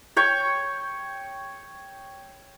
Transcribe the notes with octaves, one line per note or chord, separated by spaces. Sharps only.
C#5 G5 C#6